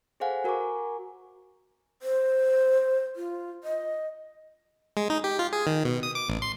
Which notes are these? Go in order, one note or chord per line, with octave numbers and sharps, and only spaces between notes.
G#4 A4 C5 F5 F#5 G#5
F#4 A#4 G#5 A#5 C#6 D6
C5
F4
D#5
G#3
D#4
G4
F4
G#4
D#3
B2
D#6
D6
A1
C6